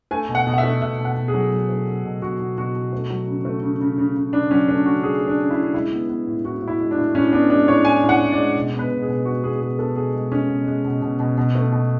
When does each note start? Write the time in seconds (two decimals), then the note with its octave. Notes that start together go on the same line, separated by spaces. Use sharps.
0.11 A3 G#5
0.29 B2
0.35 F#5
0.47 B2
0.54 F#5
0.58 E5
0.63 A3
0.82 B2 E5
0.99 B2
1.05 F#5
1.17 B2
1.28 G#4
1.34 F#3
1.52 F#3
1.69 A3
1.87 A3
2.05 B2
2.22 B2 F#4
2.40 B2
2.58 B2 F#4
2.75 B2
2.93 A3
3.10 F#3
3.27 C#3
3.45 A3
3.63 C#3
3.80 C#3
3.98 C#3
4.15 C#3
4.33 C#3 D4
4.51 F#3 C#4
4.69 A3 D4
4.86 C#3 F#4
5.03 F#3 G#4
5.21 A3
5.28 D4
5.39 C#3
5.51 E4
5.57 C#3
5.74 G#3 E4
5.92 B3
6.09 B3
6.27 A2
6.45 A2 F#4
6.61 A2
6.68 E4
6.80 G#3
6.91 D4
6.97 A2
7.15 A2 C#4
7.32 B3 D4
7.50 G#3 D4
7.68 A2 C#5
7.85 A2 G#5
8.03 A2
8.09 F#5
8.21 A2
8.32 D5
8.38 G#3
8.56 B2
8.74 B3
8.79 B4
8.91 B2
9.02 G#4
9.09 B2
9.25 G#3 F#4
9.43 B3 G#4
9.61 B2 G#4
9.79 B3 A4
9.96 B2 G#4
10.14 G#3
10.32 G#3 C#4
10.49 B2
10.66 G#3
10.84 B2
11.02 B2
11.20 B2
11.37 B2
11.55 A3
11.72 B2